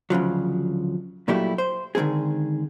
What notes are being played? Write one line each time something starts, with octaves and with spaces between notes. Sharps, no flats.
D2 C#3 F3 F#3
A#2 F#3 G3 A3 E4 G4
C5
D3 D#3 G#3 C4 G#4